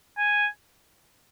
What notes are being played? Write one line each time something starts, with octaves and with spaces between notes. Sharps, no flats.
G#5